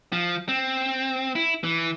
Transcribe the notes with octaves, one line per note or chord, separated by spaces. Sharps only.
F3
C4
E4
E3